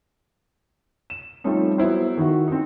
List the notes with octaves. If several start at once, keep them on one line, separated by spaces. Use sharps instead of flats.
E7
F3 G3 A3 C4 C#4 D#4
F#3 B3 E4 C5
D#3 D#4 E4 F#4
C4 D#4